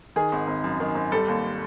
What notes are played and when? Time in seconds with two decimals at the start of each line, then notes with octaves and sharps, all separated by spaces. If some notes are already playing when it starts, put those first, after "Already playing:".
0.16 D#3 G#4
0.32 G#1
0.47 G#1
0.64 F#2
0.80 D#3
0.95 G#1
1.12 G3 A4
1.28 D#2